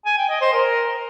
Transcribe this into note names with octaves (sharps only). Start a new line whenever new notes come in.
G#5
G5
D#5
C5
A#4